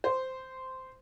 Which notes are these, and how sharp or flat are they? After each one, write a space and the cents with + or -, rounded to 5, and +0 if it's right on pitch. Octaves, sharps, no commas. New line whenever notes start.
C5 -10